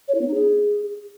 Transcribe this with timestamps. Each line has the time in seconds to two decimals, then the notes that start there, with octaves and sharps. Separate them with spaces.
0.08 C#5
0.14 E4
0.21 B3
0.27 D#4
0.34 G#4